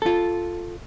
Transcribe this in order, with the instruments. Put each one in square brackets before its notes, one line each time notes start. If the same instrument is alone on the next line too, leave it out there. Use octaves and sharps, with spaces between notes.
[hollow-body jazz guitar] F4 A4